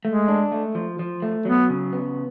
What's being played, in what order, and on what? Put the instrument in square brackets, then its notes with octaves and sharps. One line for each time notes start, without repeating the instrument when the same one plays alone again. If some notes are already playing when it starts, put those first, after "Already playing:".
[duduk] G#3 [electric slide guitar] A3
[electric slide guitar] D4
A3
F3
F3
A3
[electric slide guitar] F#3 [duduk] B3
[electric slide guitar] C#3
B3